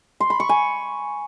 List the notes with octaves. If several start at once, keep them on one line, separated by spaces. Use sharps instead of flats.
C6
B5
C#6
G#5